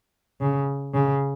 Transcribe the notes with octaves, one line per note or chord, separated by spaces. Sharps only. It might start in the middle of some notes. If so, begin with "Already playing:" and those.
C#3
C#3